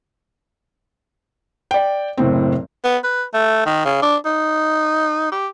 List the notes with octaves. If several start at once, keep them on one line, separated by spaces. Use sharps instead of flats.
D5 G5
F#1 A2 C4
B3
B4
A3
D#3
C#3
D4
D#4
G4